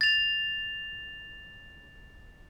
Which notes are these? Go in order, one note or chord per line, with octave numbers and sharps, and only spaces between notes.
A6 F7